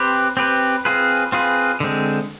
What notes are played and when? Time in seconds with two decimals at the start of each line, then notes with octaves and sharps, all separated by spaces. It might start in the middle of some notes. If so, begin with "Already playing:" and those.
Already playing: C4 G4 B4
0.37 C4 G4 B4
0.85 C4 F4 G#4 B4
1.32 C4 F4 G#4 B4
1.80 D3 G#3 C4